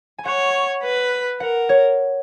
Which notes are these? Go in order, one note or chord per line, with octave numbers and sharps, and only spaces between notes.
G#5
C#5 F#5
B4
A#4 F#5
C#5